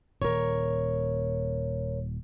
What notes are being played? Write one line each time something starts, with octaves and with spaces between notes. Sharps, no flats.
D#1 A#4 C#5